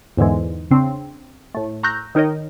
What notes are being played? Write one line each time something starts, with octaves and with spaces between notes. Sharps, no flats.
E2 G#2 D3 E3 G#3
C#3 C4 D4
A2 A3
A#5 C#6 E6 F#6 G6 A#6
D#3 D#4 A#4 C#5 D#5